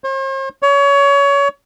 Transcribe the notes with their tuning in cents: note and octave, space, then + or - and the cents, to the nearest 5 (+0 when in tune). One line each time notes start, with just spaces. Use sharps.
C5 +45
C#5 +25